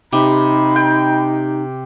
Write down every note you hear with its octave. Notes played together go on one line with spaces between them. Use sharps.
C3 D#4 G4 B5
G5